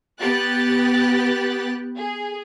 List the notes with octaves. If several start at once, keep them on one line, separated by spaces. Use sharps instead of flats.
B3 G4 F#6 A6
G#4